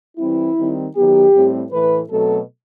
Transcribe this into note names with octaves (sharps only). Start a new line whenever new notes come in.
E3 G3 C4 E4
D#3 G3 C4
D#3 F#3 B3 G4
A2 G3 C4
A2 E3 A3 B4
B2 F#3 A3 C4 A4